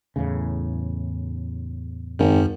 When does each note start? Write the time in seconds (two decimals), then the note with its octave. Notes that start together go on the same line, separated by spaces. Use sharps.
0.16 E2 A2 C#3
2.19 G#1 F#2